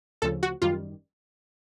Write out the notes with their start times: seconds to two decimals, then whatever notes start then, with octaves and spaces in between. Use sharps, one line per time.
0.22 D2 C#3 F3 A4
0.43 F#4
0.62 G#1 F#2 D#3 G3 F4